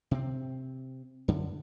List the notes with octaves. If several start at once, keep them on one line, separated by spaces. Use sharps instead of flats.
C3 C4
F#2 D3